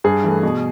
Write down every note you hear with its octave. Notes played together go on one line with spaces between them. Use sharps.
G2 G#4
E3 A3
B2